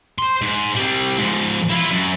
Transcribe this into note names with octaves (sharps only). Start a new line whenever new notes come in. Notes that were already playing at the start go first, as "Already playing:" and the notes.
C5 C6
G#2
G3 C4
G#2 F3
E4 F4
F#2